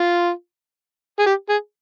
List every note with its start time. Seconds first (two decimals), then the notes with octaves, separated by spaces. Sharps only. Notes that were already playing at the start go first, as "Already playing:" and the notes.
Already playing: F4
1.19 G#4
1.26 G4
1.49 G#4